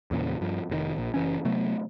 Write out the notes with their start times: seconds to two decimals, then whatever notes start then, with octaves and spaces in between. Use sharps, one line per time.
0.11 E2 A#2 C#3
0.41 G2 F3
0.70 F1 B2 D#3
0.94 D#1 A#1
1.14 F#1 E3 C#4
1.45 C3 F#3 A3 B3